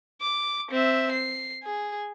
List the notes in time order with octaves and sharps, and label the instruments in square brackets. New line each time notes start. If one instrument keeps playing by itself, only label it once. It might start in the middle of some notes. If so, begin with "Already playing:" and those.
[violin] D6
C4 E5
C7
G#4